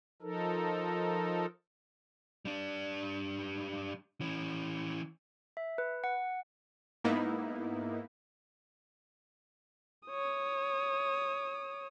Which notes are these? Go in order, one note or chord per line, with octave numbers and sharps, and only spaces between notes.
F3 D#4 A4 A#4
G3 D4
E3 C#4
E5
B4
F#5
G#2 A#3 B3 D#4 E4
C#5 D#6